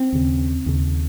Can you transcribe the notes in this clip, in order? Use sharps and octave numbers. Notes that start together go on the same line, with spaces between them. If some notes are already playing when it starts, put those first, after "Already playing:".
Already playing: C4
D#2 C#3
D#2 C#3